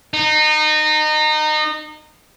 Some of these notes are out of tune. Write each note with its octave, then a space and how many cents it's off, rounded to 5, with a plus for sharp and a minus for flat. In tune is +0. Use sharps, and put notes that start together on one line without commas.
D#4 -25